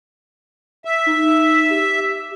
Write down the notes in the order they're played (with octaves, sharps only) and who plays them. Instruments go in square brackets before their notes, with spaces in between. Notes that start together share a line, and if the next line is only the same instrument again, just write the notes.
[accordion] E5
[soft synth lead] D#4
G4